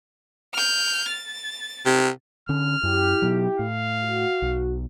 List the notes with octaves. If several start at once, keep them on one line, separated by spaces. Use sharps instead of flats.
F6 G6
A6
C3
D3 C#4 F6
F#2 E4 G4
B2 F#3
A2 F5
F#4
B1